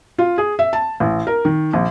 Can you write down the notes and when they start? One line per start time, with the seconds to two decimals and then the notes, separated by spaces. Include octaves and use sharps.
0.18 F4
0.38 G#4
0.59 E5
0.73 A5
1.00 A1
1.27 A#4
1.45 D#3
1.73 A#1